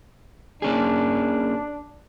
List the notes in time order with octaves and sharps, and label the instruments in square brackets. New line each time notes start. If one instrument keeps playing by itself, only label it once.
[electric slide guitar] A#3 C#4 G#4 [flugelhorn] D4